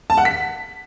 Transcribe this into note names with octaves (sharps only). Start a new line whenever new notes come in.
A5
F#5
B6